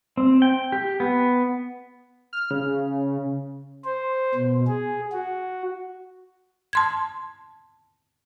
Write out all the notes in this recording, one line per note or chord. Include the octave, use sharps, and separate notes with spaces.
C4
G5
G4
B3
F6
C#3
C5
B2
G#4
F#4
A5 C6 G#6